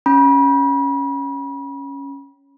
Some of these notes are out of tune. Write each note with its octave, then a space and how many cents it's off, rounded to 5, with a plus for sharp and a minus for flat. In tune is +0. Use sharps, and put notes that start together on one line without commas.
C#4 +0 B5 -35